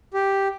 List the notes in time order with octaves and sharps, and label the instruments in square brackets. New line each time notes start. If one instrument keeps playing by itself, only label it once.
[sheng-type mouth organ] G4